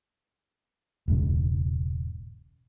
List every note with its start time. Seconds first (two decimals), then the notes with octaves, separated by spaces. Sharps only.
1.08 E1 C#2 G#2 C#3